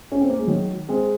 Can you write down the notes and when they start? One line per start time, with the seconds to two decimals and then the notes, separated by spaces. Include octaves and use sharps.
0.12 C#4
0.21 C4
0.30 A#3
0.39 G#3
0.47 D#3 F#3
0.89 G#3 C4